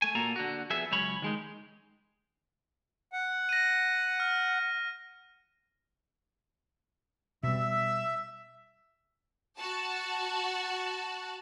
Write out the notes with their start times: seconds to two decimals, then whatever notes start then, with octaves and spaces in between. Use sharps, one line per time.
0.02 A3 G#5
0.15 A#2 A#3 F#4 A4 A#5
0.36 D3 F#4
0.70 F2 B3 G#4 E5
0.91 C#2 F#2 C#4 C#5 B5
1.22 D#3 G#3 D#4
3.13 F#5
3.49 A#6 D#7
4.20 F6
7.43 B2 G3 E5 E6
9.58 F#4 A5